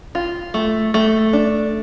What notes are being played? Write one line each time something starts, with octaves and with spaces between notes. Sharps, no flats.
F4
A3
A3
D4